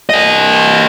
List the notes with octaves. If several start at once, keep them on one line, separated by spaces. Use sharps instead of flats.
G4 D#5